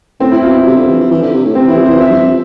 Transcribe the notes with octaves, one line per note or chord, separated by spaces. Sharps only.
A2 C4
E4
B2 F4
E4
C3
D3
E3
F3
E3
D3
C3
A2
C3 C4
E3
E4
F3
E3 C5
F2 E5
G2
F2